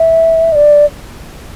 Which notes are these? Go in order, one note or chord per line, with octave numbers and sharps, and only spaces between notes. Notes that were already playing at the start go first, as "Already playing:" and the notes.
Already playing: E5
D#5
D5